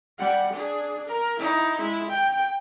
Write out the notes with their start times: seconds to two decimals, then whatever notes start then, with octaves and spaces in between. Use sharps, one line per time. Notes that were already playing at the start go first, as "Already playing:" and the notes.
0.19 G3 F#5
0.53 D4 G#4
1.07 A#4
1.39 D#4 E4
1.78 G#3 E4
2.10 G5